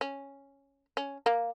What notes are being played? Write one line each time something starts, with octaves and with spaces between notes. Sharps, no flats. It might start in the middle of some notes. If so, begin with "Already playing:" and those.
C#4
C#4
A#3